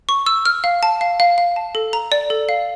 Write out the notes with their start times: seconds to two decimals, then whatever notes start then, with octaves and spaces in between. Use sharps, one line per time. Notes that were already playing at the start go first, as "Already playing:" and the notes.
0.09 C#6
0.26 E6
0.45 F6
0.64 F5
0.83 A5
1.01 F5
1.20 F5
1.38 F5
1.56 A5
1.75 A4
1.93 A#5
2.12 D5
2.30 A4
2.49 F5